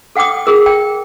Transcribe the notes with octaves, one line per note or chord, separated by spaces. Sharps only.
A4 F#5 G5 D6 D#6
G#4 A#4 D#6
G5